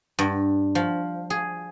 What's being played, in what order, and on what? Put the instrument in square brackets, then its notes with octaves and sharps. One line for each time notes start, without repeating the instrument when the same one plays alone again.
[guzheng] G2
F3
G#4